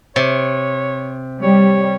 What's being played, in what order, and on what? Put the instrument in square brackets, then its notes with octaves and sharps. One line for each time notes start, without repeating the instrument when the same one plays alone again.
[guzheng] C3 [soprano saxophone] C#5
[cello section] G3 [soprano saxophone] C#5